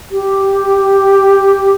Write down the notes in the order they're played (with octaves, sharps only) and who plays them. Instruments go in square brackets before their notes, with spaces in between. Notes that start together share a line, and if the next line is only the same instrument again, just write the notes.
[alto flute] G4